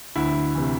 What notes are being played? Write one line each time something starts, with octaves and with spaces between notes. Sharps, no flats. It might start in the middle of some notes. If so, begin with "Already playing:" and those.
D2 E4
C3 E3